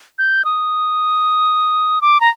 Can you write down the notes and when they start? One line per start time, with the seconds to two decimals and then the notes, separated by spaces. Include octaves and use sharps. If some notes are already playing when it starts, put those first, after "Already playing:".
0.18 G6
0.45 D#6
2.02 D6
2.21 A#5